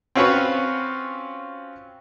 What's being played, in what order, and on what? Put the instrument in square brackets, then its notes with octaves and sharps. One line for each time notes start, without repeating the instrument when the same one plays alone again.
[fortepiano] C4 C#4 F4 F#4 B4 C#5